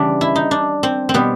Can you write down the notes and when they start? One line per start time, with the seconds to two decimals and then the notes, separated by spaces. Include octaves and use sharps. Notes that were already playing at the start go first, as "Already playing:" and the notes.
Already playing: C#3 E3 G3 D4
0.21 E4
0.36 D#4
0.51 D4
0.83 C4
1.09 C4
1.14 B2 G3 B3